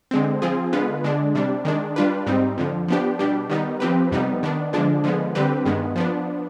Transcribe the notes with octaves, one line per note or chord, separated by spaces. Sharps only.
D3 G#3 C4
F3 C4 F4 G#4
D3 G#3 B3 F4 B4
D3 G#3 D4
C3 G3 D4
D#3 G#3 D4
G3 D4 F4 B4
G#2 G3 C4 D#4
F2 D3 F3
F3 B3 D4 G4
B2 G3 D4 G4
D#3 G3 B3 D#4
F3 C4 G4 B4
F2 C3 G3 B3 D#4
D#3 B3 D4
D3 F3 G#3 D4
D3 F3 G#3 B3
D3 G3 C4 G4 B4
G2 D#3 G#3 B3
F3 B3 D4